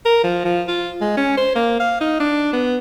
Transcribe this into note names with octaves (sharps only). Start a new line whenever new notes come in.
A#4
F3
F3
F4
G#3
C#4
C5
A#3
F5
D#4
D4
B3